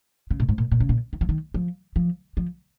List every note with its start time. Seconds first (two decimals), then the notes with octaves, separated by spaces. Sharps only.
0.31 C#3
0.40 A#2
0.49 G#2
0.58 A#2
0.72 A#2
0.80 C#3
0.89 A#2
1.13 D#3
1.21 F3
1.29 D#3
1.54 F3
1.96 F3
2.37 F3